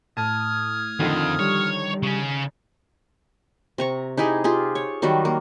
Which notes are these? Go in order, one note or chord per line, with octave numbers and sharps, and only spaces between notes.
A2 A5 D#6 F6 G#6 D#7
F2 D3 D#3 F3
G3 C#5
C#3 C#4
C3 A#5 C#6
D#4 E4 G4 G#4
F4 G4 G#4
C#5
D#3 F#3 G3 F#4
A#3